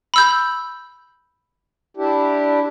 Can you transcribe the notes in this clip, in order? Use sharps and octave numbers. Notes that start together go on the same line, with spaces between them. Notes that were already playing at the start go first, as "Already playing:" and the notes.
B5 E6 G6
D4 E4 G4